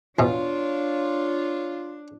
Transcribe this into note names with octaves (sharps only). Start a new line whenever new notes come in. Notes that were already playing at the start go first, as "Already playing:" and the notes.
E2 B2 D4 F4 C#5